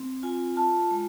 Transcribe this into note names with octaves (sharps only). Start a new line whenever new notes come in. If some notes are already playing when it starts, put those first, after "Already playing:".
Already playing: C4
F4 G#5
F4 A5
G#3 G#5